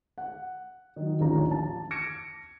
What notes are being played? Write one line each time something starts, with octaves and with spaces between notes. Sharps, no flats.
F#5
D#3 F#3
A1 D#2 D3 F3 C#4 A#5
A5
G#6 A#6 C#7 D7 E7